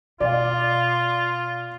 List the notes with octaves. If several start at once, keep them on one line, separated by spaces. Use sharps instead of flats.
B2 F4 D5 F5